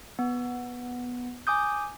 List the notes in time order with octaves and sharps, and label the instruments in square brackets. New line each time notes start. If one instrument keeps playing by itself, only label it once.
[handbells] B3
G#5 D6 D#6 G6